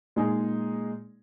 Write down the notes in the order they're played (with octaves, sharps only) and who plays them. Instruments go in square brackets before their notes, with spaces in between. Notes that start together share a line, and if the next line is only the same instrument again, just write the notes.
[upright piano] A#2 G#3 D#4 G#4